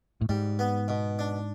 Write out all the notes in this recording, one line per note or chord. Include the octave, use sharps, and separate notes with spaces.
A2
G#2 G3
B3
B2
D4